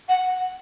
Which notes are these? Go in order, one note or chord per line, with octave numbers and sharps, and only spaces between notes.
F#5